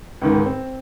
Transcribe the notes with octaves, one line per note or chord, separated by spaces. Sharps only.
C#2 G#2 D#3
C4